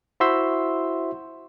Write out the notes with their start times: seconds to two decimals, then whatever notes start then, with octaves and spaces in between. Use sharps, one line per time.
0.20 E4 F#4 C5 E5 C6 E6